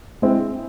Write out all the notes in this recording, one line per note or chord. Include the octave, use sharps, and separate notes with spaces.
G#3 C4 E4